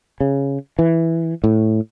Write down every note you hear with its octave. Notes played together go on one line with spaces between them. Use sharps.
C#3
E3
A2